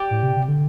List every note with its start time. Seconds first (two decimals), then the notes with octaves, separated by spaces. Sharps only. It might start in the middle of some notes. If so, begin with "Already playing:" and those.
Already playing: G4 D5 G5 D6
0.11 A2
0.23 C3
0.36 C3
0.48 D3